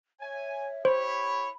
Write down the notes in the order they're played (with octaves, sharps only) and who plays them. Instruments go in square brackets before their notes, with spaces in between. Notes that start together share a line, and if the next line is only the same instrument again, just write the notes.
[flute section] C#5 E5 [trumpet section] G#5
[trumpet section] E4 G4 C#5 [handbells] C5 [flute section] B5